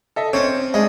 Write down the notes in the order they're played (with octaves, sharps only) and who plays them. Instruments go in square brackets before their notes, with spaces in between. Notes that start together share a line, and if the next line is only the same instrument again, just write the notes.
[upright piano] A4 D#5 E5
[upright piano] C4 [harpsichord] C#4 C#5
[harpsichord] G#3 [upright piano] D4 G#4 D#5